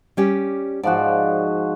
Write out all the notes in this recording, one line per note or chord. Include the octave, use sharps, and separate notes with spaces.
G3 C#4 G4
G#2 F3 F#4 D5